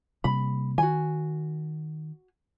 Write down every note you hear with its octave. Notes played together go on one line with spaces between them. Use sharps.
C3 G3 A#3 B5
D#3 F#4 G#5